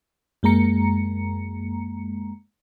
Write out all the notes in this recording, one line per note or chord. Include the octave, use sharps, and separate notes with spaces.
F#2 G#3 A#3 A#5 C#7